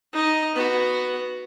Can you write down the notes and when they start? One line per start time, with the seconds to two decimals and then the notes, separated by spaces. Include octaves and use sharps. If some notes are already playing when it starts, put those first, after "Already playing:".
0.13 D#4 D#5
0.55 B3 F#4